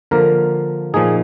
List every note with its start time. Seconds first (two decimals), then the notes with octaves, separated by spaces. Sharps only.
0.11 D3 F3 A#3 A#4
0.94 A#2 F3 A#3 D#4 G#4